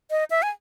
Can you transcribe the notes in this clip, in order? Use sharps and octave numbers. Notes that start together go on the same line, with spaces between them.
D#5
E5
G#5